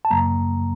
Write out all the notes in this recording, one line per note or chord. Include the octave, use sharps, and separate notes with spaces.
A5
F#2 C#3 F#3 A#3 A#5